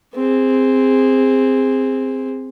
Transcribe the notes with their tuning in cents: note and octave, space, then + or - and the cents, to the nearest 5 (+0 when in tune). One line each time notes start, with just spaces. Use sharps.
C4 -5 G#4 -20